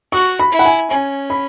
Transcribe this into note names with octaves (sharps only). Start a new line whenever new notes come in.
F#4 C#6
B5
E4
F#5
G#5
C#4 G#5
B5